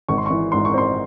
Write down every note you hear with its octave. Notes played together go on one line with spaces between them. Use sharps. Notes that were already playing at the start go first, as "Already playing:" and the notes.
G#1 C#6
C6
E3 C#6
G#2 C6
C#6
C4 C6